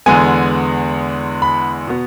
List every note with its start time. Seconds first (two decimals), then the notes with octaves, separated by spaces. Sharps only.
0.06 E2 D3 G#3 B3 G#5
1.42 B5
1.87 B2 B3